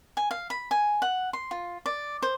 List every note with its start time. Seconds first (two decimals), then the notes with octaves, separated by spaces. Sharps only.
0.17 G#5
0.31 F5
0.50 B5
0.71 G#5
1.02 F#5
1.33 C6
1.51 F4
1.86 D5
2.22 C5